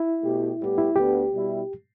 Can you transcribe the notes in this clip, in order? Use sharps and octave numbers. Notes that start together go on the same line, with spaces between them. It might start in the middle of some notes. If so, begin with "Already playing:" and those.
Already playing: E4
B2 A3 G4
A2 G3 B3 G4
E4
D2 D3 B3 D4 G4
B2 G3 E4